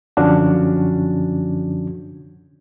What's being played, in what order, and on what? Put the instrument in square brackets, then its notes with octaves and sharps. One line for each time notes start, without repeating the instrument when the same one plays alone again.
[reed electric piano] F#2 D3 F3 C#4 D4 F#4